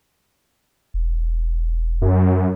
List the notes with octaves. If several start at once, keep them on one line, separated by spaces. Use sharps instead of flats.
E1
F#2